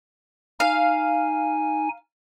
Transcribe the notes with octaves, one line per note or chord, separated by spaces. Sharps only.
D#4 F5 G#5